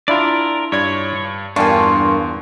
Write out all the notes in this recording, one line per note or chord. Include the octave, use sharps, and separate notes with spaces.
D4 E4 F4 A#4 D5
G2 C#5 D5 G#6
E2 G2 A#3 D4 F4 G#5 A5 C#6